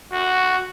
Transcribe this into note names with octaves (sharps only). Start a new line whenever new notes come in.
F#4